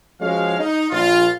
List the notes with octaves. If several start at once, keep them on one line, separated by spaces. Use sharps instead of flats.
F3 G#3 C#4 F#4 C#5 F5
D#4
A#1 F4